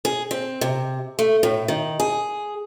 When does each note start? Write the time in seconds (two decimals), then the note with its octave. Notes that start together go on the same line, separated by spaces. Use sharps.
0.05 G#4
0.31 C4
0.61 C3
1.19 A3
1.43 A2
1.68 D#3
2.00 G#4